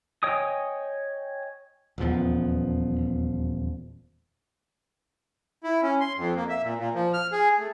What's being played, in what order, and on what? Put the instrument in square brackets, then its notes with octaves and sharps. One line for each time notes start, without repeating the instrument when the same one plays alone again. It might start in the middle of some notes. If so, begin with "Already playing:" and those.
[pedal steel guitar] C#5 D#5 G5 G#5 D#6
[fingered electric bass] D#1 E2 F3 B3
[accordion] E4
C#4
C6
F2
A#3
E5
A#2
A#2
F3
F6
G#4
A3